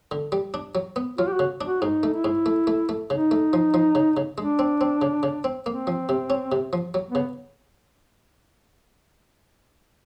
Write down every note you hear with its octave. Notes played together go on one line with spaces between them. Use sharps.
D3
G3
D4
F#3
B3
F#3 F4
G4
F#4
C#3
D4
F#4
G#2 D#4
A3
E4
G#2
A3
A3
A3
C#3 D#4
A3
F3
F3
C#3
C#3
G#3 D4
C4
C4
C#3
C#3
C4
A#3 C4
F3
C3
C#4
C3
F3
F#3
C#3 B3